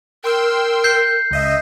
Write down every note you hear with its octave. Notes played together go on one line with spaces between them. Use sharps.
A#4 G5 C6 E6
G6 C7
C#2 D#5 E5